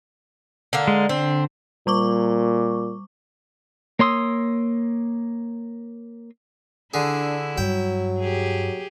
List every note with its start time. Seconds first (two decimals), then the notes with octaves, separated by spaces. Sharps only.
0.73 D3 A#3
0.88 G#3
1.09 D3 C4
1.87 A#2 G3 C#6 D6
3.99 A#3 C#5 C6 D#6 E6
6.94 D3 D4 E4 G#4
7.58 G2 F#3 G5
8.19 G4 G#4